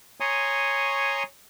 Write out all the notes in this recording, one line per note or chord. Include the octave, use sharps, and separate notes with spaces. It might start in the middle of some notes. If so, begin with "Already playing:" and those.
C#5 G#5 A#5 C6 C#6 D#6